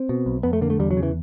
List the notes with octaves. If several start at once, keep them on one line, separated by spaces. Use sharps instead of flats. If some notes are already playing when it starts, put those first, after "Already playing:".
Already playing: C4
B2
B1
F2 B3
A3
D3 A#3
A3
E2 G3
F#3
C#3
E3